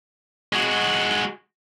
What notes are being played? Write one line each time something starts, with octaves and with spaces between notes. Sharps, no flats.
G#3 F#4